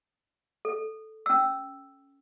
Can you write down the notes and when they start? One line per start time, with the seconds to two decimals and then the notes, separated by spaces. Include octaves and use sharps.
0.65 A4
1.26 C#4 E6